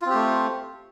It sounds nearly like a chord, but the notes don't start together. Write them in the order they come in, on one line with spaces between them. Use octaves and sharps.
F4 C4 G4 A3